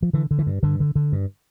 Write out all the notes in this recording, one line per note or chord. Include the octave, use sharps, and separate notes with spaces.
F3
D3 E3
D3
E3
G2
G2 D3
D3
D3
G2